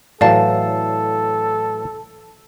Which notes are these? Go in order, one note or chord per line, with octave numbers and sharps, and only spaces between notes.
A2 E3 F#3 A4 D5 F5 A5